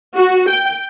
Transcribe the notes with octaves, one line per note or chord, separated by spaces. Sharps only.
F#4
G5